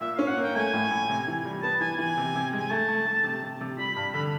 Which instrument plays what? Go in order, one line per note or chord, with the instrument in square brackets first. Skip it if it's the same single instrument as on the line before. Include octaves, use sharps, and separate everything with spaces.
[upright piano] A#2 [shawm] E5
[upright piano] C#4 [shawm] F5
[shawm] F#5
[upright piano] A#3
[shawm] G5
[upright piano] A3 [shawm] G#5
[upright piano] A2
A2
C3
E3
G3
[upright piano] B3 [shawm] A5
[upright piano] E3 [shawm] G#5
[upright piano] E3 [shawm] G#5
[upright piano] C3
C3
G#3
[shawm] G#5
[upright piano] A3 [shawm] A5
[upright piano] A3
A3
C3
C3
C3
[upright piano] G3 [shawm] B5
[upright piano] G2 [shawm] B5
[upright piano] D3 [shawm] B5